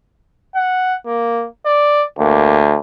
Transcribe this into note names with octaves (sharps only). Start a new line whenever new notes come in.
F#5
A#3
D5
D2 A#3